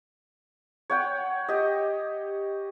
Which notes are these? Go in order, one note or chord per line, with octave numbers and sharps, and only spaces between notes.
C#5 F#5 G5
G4 D#5